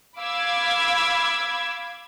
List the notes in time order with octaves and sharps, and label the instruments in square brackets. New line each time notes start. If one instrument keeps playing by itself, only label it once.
[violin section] F5 B5 D6 E6 G#6